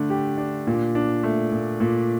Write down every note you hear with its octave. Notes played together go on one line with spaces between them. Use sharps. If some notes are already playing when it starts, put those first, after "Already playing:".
Already playing: D3 A3 D4
G4
D4
A#2
D4
A3
A#2
A#2